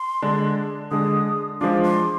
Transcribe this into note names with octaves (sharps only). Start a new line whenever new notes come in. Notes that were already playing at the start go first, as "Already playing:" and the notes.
Already playing: C6
D3 G#3 D4
D3 G#3 D4 D#6
F3 G#3 D4 F4 D6
C6